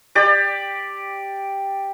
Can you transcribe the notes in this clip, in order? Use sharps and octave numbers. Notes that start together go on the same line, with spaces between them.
G4 D5